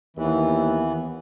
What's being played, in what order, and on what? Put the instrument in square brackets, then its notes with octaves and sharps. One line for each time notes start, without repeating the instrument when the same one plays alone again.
[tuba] D#2 [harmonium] E3 [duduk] B3